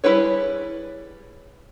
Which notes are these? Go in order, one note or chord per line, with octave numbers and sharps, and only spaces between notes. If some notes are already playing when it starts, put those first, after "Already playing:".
G3 E4 G#4 B4 C#5